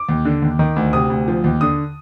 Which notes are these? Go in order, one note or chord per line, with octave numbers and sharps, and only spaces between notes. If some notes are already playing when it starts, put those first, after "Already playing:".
Already playing: D6
D#2
D3
D#2
D#3
D2
C3 D#6
D2
F3
D#2
D3 D#6